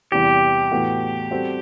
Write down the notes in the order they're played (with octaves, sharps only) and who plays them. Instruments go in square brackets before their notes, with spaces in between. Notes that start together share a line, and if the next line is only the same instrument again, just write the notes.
[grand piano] E2 C3 E3 G3 [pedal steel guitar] G4
[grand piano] A2 E3 B3 F#4 A4
G3 C4 F#4 A4